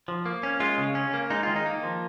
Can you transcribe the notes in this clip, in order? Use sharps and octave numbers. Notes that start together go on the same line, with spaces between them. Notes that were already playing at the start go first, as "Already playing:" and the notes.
F3
A#3
C#4
G#3 F4
C#3
C#4
A#3
G#3 D#4
D#3 F4
D#4
A#3
F3